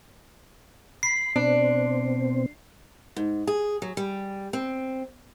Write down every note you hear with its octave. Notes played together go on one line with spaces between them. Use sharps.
B5 C7
B2 C4 D4
G#2
G#4
F#3
G3
C4